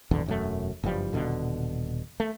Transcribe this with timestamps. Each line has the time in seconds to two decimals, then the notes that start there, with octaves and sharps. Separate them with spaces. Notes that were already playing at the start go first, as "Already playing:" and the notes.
0.11 D#1 G#1 E2 D3
0.26 E1 F#2 A3
0.83 F#1 G2 F3 G3
1.13 D#1 B2 D3
2.20 A3